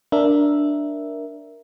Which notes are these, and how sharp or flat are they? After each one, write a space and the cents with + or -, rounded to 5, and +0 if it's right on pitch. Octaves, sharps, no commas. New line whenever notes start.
D4 +0 A#4 +5 E5 +0